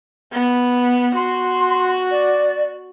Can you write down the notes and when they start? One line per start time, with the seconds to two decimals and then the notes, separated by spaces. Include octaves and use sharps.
0.33 B3
1.16 F#4 C6
2.11 D5